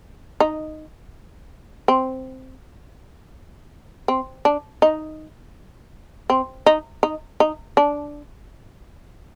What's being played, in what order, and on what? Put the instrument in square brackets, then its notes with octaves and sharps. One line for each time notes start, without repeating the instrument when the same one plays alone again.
[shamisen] D#4
C4
C4
D4
D#4
C4
D#4
D#4
D#4
D4